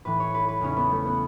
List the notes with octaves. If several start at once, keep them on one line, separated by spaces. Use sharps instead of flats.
A2 E3 B4
C#5
B4
B4
E2 C#3 E3 C#4
B3
A3
B3